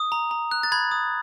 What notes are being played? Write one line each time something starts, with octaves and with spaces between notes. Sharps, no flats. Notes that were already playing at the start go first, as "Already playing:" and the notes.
Already playing: D#6
A#5
A#5
F#6
A6
B5 G#6
D#6